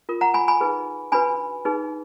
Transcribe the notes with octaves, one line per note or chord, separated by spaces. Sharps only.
F4 A#4
F#5 A#5
G#5 B5
G#5 B5
D#4 G#4 B4
D4 F#4 B4 G#5 B5
D#4 G#4 B4